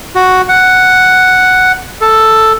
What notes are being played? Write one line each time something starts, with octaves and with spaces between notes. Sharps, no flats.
F#4
F#5
A4